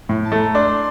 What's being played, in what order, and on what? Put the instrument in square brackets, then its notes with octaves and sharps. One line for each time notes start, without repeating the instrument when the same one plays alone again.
[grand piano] A2
[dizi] A5
[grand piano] A3
[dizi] A#5
[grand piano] D4 [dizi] C6